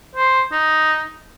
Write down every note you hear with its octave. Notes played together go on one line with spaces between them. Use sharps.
C5
D#4